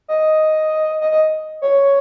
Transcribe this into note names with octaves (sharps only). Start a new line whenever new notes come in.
D#5
D#5
D#5
C#5